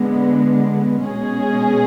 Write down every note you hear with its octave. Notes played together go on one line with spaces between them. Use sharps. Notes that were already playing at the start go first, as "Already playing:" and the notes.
Already playing: D3 G#3 B3
B2 G#3 C#4 G#4